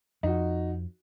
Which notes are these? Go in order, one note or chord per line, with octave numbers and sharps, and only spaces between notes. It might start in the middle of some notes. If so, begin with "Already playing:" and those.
F2 D#4 F#4